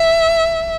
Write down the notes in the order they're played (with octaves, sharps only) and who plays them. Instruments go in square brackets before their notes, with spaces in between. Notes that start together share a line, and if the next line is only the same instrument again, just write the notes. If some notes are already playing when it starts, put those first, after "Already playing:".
Already playing: [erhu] E5